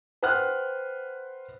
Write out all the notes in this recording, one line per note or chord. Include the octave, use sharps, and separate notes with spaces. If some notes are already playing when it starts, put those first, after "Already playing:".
B4 C5 F#5 G5 F6 F#6